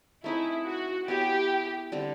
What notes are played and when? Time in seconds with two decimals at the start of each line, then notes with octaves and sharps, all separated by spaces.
0.24 A3 C4 D#4 E4 G#4
0.65 F#4
1.08 B3 E4 G4 G#4 C#5
1.92 D3 G3 C4